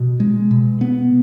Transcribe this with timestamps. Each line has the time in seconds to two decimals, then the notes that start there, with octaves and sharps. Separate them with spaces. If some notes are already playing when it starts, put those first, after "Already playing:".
Already playing: B2
0.20 G#3
0.51 B2
0.81 B3